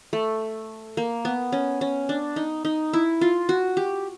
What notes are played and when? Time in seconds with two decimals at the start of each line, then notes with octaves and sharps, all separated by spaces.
0.13 A3
0.97 A#3
1.25 B3
1.52 C#4
1.81 C#4
2.09 D4
2.36 D#4
2.65 D#4
2.93 E4
3.21 F4
3.49 F#4
3.77 G4